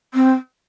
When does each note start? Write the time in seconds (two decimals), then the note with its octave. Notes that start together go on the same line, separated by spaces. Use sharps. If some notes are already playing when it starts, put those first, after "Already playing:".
0.14 C4